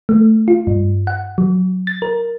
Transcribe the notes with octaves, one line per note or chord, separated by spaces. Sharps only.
A3
F4
G2
F#5
F#3
A6
A#4